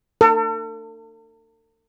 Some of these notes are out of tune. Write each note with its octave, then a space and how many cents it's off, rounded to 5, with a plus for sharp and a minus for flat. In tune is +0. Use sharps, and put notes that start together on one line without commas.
A4 +45